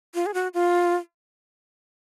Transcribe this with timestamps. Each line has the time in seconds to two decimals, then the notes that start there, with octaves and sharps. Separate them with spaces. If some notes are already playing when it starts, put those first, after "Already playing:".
0.15 F4
0.26 G#4
0.34 F#4
0.54 F4